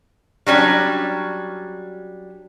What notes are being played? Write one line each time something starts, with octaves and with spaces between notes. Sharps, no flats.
F#3 G3 C#4 D4